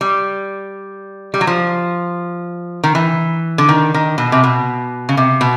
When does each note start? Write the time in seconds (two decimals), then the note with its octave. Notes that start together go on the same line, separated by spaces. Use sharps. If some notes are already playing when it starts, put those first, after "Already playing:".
0.01 G3
1.34 G3
1.41 F#3
1.47 F3
2.84 D#3
2.95 E3
3.58 D3
3.69 D#3
3.94 D#3
4.18 B2
4.32 C3
4.44 B2
5.09 C#3
5.17 C3
5.41 B2